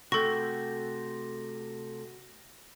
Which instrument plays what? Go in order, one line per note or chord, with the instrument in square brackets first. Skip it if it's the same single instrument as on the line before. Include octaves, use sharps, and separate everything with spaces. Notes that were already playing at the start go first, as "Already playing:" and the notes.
[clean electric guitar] C3 A3 [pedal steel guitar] F#4 G5 [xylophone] A4 C#6 [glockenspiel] A#6